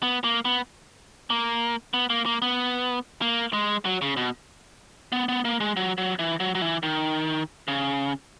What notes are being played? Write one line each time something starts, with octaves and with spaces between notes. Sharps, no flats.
B3
A#3
B3
A#3
B3
A#3
A#3
B3
A#3
G#3
F#3
C#3
B2
B3
B3
A#3
G#3
F#3
F#3
E3
F#3
F#3
E3
D#3
C#3